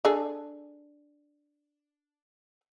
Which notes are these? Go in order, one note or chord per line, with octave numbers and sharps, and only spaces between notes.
D4 G#4 A4